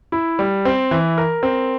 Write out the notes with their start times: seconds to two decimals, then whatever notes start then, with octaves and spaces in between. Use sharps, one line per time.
0.12 E4
0.39 G3
0.65 C4
0.91 E3
1.18 A#4
1.43 C4